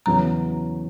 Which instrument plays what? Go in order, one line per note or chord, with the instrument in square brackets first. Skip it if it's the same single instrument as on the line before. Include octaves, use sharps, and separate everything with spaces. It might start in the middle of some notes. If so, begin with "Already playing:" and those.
[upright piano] E2 C#3 F#3 [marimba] A#5